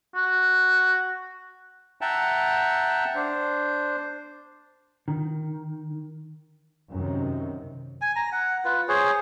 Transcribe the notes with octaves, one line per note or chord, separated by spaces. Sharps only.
F#4
E5 F#5 G5 A5 A#5
D4 C5
D#3
F#2 C3 D#3
G#5
A#5
F#5
F4 B4
G#4 C5 C#5